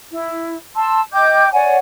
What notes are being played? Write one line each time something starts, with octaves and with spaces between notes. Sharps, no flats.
E4
A5 C6 E6
D#5 G5 D6 G6
C#5 D5 F#5 G#5